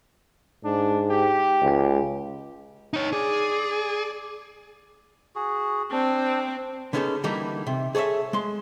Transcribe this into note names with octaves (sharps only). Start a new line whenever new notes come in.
G#2 D4
G4
C#2
D#4 C#5
G#4 D5
F#4 G#4
C4 D4
D3 B3 C#4 D#4 G#4 A4
D3 E3 G3 A#3 D#4
C3
G#4 A4 C#5 D#5 E5
G#3 C6